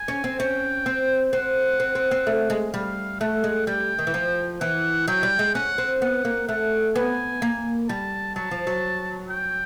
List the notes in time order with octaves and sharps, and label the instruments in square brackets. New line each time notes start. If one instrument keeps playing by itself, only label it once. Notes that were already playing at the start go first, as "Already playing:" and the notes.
Already playing: [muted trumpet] G#5
[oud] C#4
C4
[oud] C#4 [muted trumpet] G5
[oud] C4
[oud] C4 [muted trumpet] F#5
[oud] C4
C4
C4
A3
G#3
[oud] G3 [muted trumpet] F5
[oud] A3 [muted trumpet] F#5
[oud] G#3
[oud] G3 [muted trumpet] G5
[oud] D#3
E3
F3
[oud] E3 [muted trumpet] F#5
[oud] F#3 [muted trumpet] G5
[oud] G3
G#3
[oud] C#4 [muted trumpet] F#5
[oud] C4
[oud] B3 [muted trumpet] F#5
[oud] A#3
[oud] A3 [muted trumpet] F#5
[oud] B3 [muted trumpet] G#5
[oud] A#3
[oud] G3 [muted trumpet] A5
[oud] F#3 [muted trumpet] A5
[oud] F3
F#3
[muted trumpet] G5